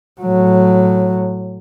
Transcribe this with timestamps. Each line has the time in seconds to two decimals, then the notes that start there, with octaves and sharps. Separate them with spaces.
0.21 A2 F#3